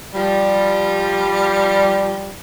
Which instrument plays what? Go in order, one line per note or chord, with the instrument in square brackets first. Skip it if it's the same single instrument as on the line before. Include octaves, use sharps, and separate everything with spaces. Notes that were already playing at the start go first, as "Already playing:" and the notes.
[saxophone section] F3 G3